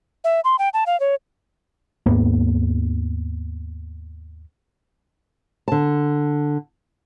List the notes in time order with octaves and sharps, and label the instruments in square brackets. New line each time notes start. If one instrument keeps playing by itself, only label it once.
[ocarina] E5
C6
G5
A5
F5
C#5
[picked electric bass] D#2 G#2 A#3 B3
[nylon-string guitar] D3 A5